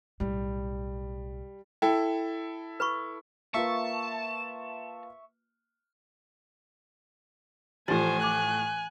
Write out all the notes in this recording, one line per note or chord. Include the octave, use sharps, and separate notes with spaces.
B1 A2 G3
E4 A4 G5
B4 B5 C#6
A#3 F4 B4 E5 A5 C#6
A2 E3 F3 G4 C5 G#5 A6
D6 F#6 G#6